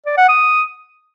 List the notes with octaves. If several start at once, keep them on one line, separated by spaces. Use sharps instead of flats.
D5
F#5
D#6